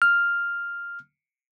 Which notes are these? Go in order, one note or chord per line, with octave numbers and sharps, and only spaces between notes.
F6